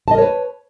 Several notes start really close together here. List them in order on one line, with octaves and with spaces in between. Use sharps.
A5 D#5 A#4 C#5 B4